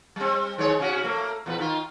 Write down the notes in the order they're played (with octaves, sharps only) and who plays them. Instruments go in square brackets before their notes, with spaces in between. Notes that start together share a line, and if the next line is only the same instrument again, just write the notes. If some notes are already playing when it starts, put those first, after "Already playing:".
[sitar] G3 C4
D#3 G#3 C#5
C3 C#4 F#4
A3 A#3
E2 A#2 B4
D#3 F4